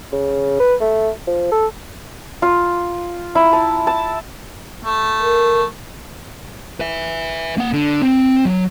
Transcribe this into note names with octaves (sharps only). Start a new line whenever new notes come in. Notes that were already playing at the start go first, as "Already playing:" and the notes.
C#3
B4
A3
F3
A4
F4
E4
A5
A5
A3
A#4
B4 E5
A#3 F#5
D3
C4
F#3